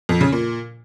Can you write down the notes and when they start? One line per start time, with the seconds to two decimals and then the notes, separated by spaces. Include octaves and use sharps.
0.09 F2
0.21 C#3
0.32 A#2